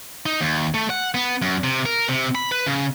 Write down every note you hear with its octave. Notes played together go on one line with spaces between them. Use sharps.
D#4
D#2
A3
F#5
B3
F#2
C3
A#4
C3
B5
B4
C#3